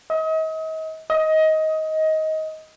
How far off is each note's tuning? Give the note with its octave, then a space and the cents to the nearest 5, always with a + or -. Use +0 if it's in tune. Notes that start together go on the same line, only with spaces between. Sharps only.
D#5 +40
D#5 +20